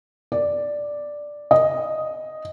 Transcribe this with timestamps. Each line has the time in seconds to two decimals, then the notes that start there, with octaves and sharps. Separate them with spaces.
0.32 D5
1.51 D#5